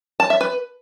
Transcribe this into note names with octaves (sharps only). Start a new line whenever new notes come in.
A5
E5
B4